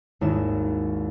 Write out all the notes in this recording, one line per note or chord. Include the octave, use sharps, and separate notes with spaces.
G#1 D#2 E4 E7